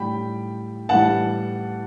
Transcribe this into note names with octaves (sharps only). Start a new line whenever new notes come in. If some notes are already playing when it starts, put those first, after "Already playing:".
Already playing: A2 G3 G5 B5
A2 E3 G3 F#5 A5